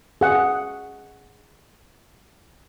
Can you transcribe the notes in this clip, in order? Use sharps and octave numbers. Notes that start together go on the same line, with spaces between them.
G#4 F#5